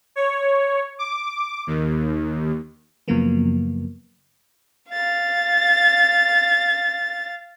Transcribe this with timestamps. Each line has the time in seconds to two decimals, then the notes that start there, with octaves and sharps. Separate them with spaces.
0.16 C#5
0.99 D6
1.67 D#2
3.08 F#2 C#3 F3 F#3 A#3 B3
4.91 F5 A6